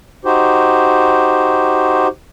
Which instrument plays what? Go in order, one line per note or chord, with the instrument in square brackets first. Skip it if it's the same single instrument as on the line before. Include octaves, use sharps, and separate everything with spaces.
[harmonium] D#4 F#4 G4 C5